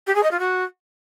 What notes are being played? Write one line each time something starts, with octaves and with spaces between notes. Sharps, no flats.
G4
G#4
D#5
F4
F#4